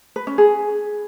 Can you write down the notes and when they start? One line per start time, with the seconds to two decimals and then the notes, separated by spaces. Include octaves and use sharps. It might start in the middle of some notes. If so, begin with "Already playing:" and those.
0.16 B4
0.27 C#4
0.38 G#4